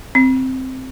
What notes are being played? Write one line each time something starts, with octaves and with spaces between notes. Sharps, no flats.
C4